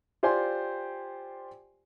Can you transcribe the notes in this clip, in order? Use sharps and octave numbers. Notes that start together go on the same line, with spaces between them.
F4 G4 C5 D5 G#5 C6